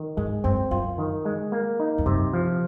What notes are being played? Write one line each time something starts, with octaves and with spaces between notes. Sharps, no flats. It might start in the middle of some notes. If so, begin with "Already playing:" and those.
Already playing: D#3
G#2 G#3
F#2 C4
F#2 F4
D#3
G#3
A#3
D#4
F2
F#2 C3
F3